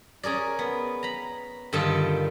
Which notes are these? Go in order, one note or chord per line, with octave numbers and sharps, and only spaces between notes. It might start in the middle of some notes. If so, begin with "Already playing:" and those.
C#4 G#4 A#4 D5
B3
A#5 B5
G2 D3 D#3 F4 A4 A5